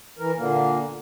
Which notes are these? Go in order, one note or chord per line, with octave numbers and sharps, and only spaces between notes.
E3 A#4
A#2 D3 A#3